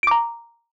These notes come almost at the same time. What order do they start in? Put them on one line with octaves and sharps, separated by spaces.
D7 D6 A#5